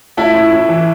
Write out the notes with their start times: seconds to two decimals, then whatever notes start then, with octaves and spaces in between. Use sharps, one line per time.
0.17 A3 E4
0.35 A2
0.51 A2
0.69 E3